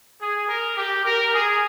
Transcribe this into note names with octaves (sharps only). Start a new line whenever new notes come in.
G#4
A#4
G4
A#4
G#4